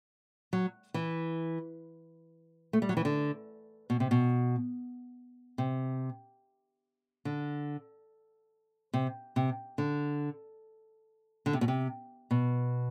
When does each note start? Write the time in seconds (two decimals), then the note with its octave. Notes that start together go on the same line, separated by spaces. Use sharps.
0.53 F#3
0.94 E3
2.73 A3
2.82 G3
2.89 F#3
2.97 E3
3.05 D3
3.90 B2
4.00 C3
4.11 B2
5.58 C3
7.25 D3
8.94 C3
9.36 C3
9.78 D3
11.46 D3
11.53 C3
11.61 B2
11.68 C3
12.31 B2